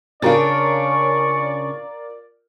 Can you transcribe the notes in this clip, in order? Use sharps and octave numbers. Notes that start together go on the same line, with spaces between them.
C#3 C#4 D4 F4 A#4 D5 C#6 A6